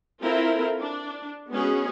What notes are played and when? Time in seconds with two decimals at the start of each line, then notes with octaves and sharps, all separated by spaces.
0.21 C4 E4 F4 A4 A#4
0.79 D4
1.51 G#3 B3 C#4 F#4 G#4